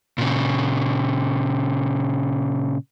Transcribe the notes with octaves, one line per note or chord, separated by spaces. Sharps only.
A#2 C#3